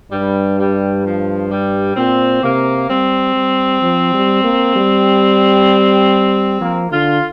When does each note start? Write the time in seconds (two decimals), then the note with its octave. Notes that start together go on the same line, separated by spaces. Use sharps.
0.11 G2 G3
0.58 G3
1.04 F3
1.50 G3
1.97 A#2 C4
2.42 C3 A#3
2.89 G3 C4
3.36 G3
3.82 F3
4.14 G3
4.44 A#3
4.76 G3
6.61 F3 A#3
6.91 D3 F4